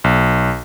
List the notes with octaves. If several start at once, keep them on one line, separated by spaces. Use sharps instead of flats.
B1